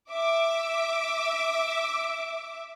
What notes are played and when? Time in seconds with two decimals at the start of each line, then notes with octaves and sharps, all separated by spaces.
0.10 E5 D6